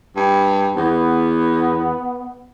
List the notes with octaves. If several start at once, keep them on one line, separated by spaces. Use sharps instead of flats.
G2
E2 B3